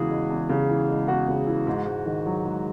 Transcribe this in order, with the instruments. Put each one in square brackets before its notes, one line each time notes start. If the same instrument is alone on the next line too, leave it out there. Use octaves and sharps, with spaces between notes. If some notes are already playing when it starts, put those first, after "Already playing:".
Already playing: [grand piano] E2 C#3 E3 G#3 F#4 G#4
G#3
E2
C#3
E3
G#3
E2 F#4
C#3
E3
G#2
G#2
D#3
F#3
G#2